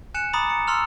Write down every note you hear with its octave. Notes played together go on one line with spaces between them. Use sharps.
G#5 F#6 C#7 E7
A#5 B5 D6 D#6 A6
C#7
A#5 C6 E6 F6 F7